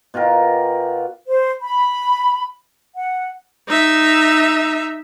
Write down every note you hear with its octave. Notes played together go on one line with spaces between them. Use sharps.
B2 F4 G4 A#4
C5
B5
F#5
D#4 E5